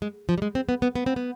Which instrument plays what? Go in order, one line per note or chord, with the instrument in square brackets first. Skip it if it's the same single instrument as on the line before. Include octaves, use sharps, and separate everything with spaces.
[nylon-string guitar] G#3
F3
G3
G#3
C4
B3
B3
B3
C4
B3